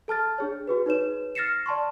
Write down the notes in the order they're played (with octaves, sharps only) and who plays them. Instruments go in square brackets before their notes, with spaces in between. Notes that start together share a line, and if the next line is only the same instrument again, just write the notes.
[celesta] A4 A5 F6 A6
D4 G#4 C#5
F#4 G#4 B4
D#4 B4 C#5 E7
F6 A6 A#6 C7 C#7 E7
D5 A5 C6 C#6